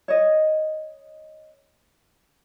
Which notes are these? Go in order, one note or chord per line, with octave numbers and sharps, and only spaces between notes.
C#5 D#5